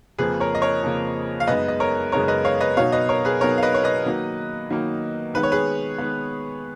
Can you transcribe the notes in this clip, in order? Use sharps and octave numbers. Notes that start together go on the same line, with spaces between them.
F2 C#3 F3 A#3 G#4 B4
A#4 C#5
D#5
A#4 C#5
F2 C#3 F3 A#3
F5
F#2 C#3 G#3 B3 D#4 B4 D#5
D#5
A#4 C#5
F#2 C#3 G#3 B3 D#4 A#4 C#5
B4 D#5
C#5 F5
B4 D#5
B2 F#3 B3 D#4 C#5 F5
B4 D#5
A#4 C#5
G#4 B4
B2 F#3 B3 D#4 A#4 C#5
F5
B4 D#5
C#5
B4 D#5
D#3 F#3 A#3 D#4
D#3 F#3 A#3 D#4
D#3 G#3 B3 B4
C#5
G#4 B4
D#3 G#3 B3